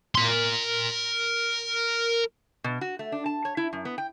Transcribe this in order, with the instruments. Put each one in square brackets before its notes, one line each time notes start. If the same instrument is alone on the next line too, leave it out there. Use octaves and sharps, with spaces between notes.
[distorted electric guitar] A#4 C6
[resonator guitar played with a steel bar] B2
F#4
A3
D4
A5
C#5
E4
F#2
B3
G5